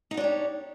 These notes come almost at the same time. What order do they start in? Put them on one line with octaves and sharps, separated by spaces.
D#4 F#4 D4 C#5 G4